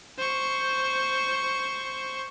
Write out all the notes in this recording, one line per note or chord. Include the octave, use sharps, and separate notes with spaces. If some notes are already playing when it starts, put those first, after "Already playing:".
C5 C#6